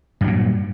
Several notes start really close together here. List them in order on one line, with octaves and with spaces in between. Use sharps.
G2 F#3 A#2